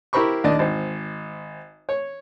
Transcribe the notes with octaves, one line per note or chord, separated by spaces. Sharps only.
E4 G4 A#4 C5 B5 C#6
D#2 D4 D5 D#5
G#1 C5
C#5